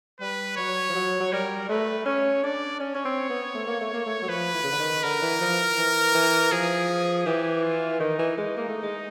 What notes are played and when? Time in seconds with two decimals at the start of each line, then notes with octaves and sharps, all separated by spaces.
0.20 G3 B4
0.57 F#3 C#5
0.90 F3
0.95 F#3
1.20 F#3
1.32 G3 A#4
1.69 A3 B4
2.05 C#4 C#5
2.43 D4 D5
2.80 C#4 C#5
2.94 C#4
3.05 C4
3.30 B3
3.54 A3
3.67 A#3
3.81 A3
3.94 A#3
4.06 A3
4.22 F#3
4.28 F3 B4
4.54 E3
4.63 C#3
4.71 D3
4.78 D#3
5.03 D3 A#4
5.22 E3
5.41 F3
5.78 E3
6.15 E3
6.52 F3 G#4
7.26 E3 G4
7.63 F4
8.00 D#3 D#4
8.19 E3
8.38 G#3
8.57 A#3
8.69 A3
8.83 G#3